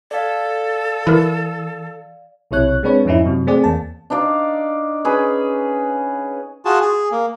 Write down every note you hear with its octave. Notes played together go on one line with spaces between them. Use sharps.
A4 D5 F5
E3 E4 A#4
B1 C3 E4 C#5 F#6
G#3 C4 D4 B4 C#5
F2 G#2 F3 C#4 D#4 E4
F#2 C3 F#3
A3 C4 G#4 D5
E2 A#3 A5
D4 D#4 D5 F5
C#4 G#4 B4
F4 F#4 G#4 A5
G#4
A#3